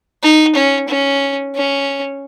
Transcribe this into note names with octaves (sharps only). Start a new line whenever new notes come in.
D#4
C#4
C#4
C#4